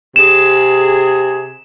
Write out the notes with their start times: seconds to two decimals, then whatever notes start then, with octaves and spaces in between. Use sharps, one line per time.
0.16 C3 G#4 E7